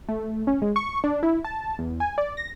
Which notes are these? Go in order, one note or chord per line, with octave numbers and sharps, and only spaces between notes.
A3
C#4
G#3
C#6
D4
E4
A5
E2
G#5
D5
A#6